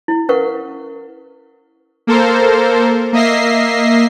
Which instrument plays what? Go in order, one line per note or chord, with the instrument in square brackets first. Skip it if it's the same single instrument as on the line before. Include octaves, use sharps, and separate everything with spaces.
[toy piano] E4
C#4 A#4 B4 F5 F#5 C#6
[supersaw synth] A#3 A4 A#4 C5
A#3 D#5 E5 A#6 C7